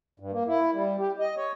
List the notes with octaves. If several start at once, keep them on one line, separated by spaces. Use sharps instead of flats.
G2
A#3
E4
G3
G4
D#5
C#5